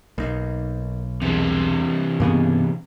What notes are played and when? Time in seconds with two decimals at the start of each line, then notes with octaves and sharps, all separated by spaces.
0.18 B1 A#3 D#4
1.22 E2 C3 E3
2.20 G2 C#3 A#3 B3